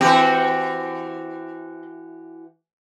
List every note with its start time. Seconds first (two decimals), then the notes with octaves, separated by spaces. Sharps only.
0.01 E3 C4 F#4 G4